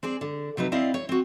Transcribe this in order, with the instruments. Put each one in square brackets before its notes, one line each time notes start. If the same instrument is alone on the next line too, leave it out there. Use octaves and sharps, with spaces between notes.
[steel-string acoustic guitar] C4 G#4 D5
D3
C3 F#3 D#4 B4
C4 E4 D5 D#5 F5
C#5
C4 F#4